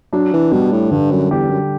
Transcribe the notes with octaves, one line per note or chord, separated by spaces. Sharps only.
F#3 D4
E3
B2 G3
A2
G2 D3
F#2
E2 G4
F#2